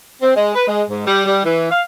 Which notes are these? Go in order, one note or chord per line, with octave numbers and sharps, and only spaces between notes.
C4
G#3
B4
G#3
G#2
G3
G3
E3
F5